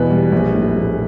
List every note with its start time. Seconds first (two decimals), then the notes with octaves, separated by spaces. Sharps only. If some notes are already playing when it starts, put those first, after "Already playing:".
Already playing: E2 B2 B4
0.10 G3
0.32 A#1
0.55 A2
0.77 A#1